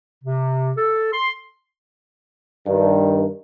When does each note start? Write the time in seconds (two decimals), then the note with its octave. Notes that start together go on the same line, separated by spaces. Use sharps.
0.23 C3
0.77 A4
1.13 C6
2.67 G2 D#3